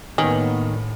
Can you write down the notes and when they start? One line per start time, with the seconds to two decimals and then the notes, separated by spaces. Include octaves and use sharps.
0.18 A2 D#3 A#3 B3 C#4